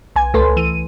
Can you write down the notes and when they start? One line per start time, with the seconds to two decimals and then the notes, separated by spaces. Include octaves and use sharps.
0.16 B1 G#5 G#6
0.34 C#2 A3 A4 B4 C6
0.57 E3 D#7